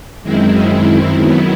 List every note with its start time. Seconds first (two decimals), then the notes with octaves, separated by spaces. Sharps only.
0.23 F#2 D#3 G#3 C4 E4
1.19 D#3 F#3 B3 E4